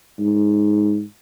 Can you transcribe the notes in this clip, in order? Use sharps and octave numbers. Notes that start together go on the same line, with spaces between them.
G#2